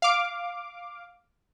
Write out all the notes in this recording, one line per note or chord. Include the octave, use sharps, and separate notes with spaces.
F5 D6